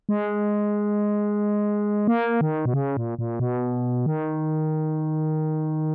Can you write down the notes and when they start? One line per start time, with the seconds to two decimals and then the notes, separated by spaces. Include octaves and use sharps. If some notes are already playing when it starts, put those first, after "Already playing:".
0.09 G#3
2.07 A#3
2.41 D#3
2.66 B2
2.74 C#3
2.97 A#2
3.19 A#2
3.40 B2
4.06 D#3